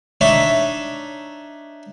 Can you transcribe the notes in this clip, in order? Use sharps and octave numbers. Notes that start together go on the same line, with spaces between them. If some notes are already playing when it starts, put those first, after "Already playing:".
D4 D#4 C#5 E5